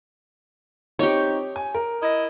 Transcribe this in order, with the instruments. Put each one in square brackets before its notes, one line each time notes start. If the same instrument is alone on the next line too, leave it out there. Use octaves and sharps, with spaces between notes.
[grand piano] C4 D#4 C#6 [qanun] G4 C#5
[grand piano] G#5
A#4
[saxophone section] E4 D#5